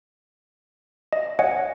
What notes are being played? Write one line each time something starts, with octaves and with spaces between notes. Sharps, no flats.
D#5
C#5 D#5 F#5 G#5